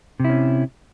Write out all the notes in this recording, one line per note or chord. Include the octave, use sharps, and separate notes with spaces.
C3 C#4 E4